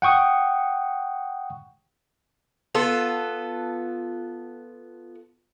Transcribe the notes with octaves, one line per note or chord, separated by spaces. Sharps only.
F#5 G5 C#6 D#6
B3 F4 A4